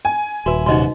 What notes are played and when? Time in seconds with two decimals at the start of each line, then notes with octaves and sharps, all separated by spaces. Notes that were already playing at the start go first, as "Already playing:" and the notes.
0.05 G#5
0.46 D#1 E4 F#4 B4
0.66 C2 F#2 D#4 F#4 D#5 C6